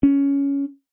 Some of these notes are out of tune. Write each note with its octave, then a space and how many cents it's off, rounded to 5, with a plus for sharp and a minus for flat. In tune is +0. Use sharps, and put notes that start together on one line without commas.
C#4 +10